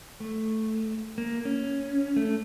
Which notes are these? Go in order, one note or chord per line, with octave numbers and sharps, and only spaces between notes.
A3
A#3
C#4
A3